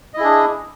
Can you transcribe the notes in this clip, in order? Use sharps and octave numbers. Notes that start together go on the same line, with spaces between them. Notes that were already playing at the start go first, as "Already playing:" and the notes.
D4 E4 G#4 D#5